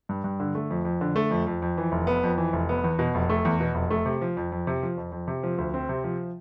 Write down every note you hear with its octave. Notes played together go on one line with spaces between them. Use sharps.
G2
G2
D3
A3
F2
F2
D3
A3
F2
F2
F2
E3
F1
B3
F2
E3
F1
B3
E2
B2
F1
A3
E2
B2
F1
A3
C3
F3
F2
F2
C3
F3
F2
F2
C3
F3
D2
C4
C3
F3